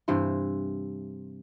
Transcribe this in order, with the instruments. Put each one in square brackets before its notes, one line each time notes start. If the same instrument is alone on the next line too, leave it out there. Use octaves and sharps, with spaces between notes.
[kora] G2 C3 E3 C5